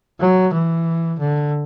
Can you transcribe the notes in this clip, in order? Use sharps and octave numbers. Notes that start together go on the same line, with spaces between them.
F#3
E3
D3